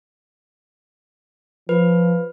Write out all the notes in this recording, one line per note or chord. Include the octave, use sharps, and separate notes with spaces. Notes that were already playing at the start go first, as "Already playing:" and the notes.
F3 B4